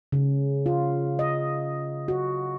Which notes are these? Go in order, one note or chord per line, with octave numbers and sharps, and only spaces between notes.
C#3
F4
D#5
F#4